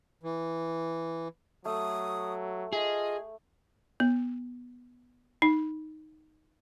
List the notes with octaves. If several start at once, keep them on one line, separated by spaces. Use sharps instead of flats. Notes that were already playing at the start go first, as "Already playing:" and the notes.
E3
F#3 A3 D#6
F4 G#4 D#5
B3
D#4